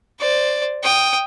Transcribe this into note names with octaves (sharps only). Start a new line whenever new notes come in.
C5 D5
G5 D#6